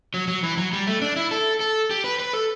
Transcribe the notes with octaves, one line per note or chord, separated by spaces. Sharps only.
F#3
F#3
E3
F#3
G3
A3
D4
E4
A4
A4
G4
B4
B4
A4